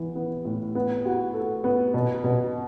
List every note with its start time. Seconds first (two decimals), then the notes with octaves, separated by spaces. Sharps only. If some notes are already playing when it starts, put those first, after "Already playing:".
Already playing: E3 B3
0.15 B3
0.45 A2
0.75 B3
1.05 F#4
1.34 A4
1.64 B3
1.94 B2
2.24 B2